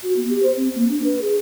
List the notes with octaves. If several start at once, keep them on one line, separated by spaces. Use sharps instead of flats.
F#4
B3
G4
C5
C4
A#3
D4
B4
G#4